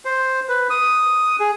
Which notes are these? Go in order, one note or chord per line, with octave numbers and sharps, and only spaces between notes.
C5
B4
D#6
G#4